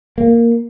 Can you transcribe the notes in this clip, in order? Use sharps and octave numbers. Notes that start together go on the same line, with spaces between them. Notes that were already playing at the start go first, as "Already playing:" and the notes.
A#3